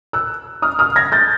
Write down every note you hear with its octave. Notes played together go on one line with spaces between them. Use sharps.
E6 F#6
D#6 F6
D#6 F6
G#6 A#6
G6 A6